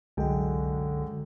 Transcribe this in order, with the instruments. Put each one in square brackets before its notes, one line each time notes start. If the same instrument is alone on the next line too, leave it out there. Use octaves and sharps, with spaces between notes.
[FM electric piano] C2 F#4 [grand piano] F#2 G#3 G5 [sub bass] D3